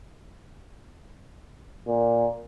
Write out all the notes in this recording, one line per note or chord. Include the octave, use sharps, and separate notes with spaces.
A#2